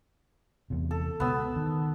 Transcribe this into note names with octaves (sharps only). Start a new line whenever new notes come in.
E2 C3
A4
C#2 B2 B3 E6
D#3